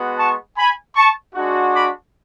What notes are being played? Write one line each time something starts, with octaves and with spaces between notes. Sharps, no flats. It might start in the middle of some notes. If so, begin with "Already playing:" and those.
Already playing: G#3 B3 F#4
A5 C#6
G#5 B5
A5 C#6
G#3 D4 F#4
B5 D6